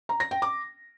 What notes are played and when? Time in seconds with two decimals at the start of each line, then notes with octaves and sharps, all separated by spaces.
0.09 A#5
0.20 A#6
0.31 G5
0.42 D6